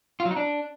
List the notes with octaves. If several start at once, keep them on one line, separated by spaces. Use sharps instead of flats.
F4
F#3
D#4
D4